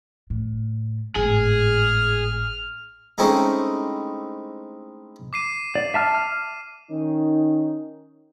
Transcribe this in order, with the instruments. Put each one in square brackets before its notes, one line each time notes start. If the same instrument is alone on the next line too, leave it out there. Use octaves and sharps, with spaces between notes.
[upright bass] A2
[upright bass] G#1 A2 [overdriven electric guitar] G#4 [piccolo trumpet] F6
[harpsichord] G#3 A3 C4 C#4 D#4 E4
[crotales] D6 C7 D#7
[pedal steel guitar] D5
E5 A5 F6
F6
[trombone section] D#3 C#4 D#4